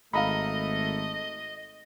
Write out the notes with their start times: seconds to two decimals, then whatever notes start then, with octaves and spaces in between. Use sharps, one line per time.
0.13 G#1 A3 D#5 F5 A#5 B5